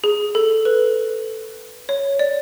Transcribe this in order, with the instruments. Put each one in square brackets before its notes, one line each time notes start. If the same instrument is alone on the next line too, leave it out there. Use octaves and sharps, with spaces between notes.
[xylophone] G#4
A4
B4
C#5
D5